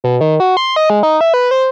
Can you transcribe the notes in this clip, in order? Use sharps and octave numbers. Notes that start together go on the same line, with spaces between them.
B2
D#3
F#4
C6
D#5
G#3
D#4
E5
B4
C5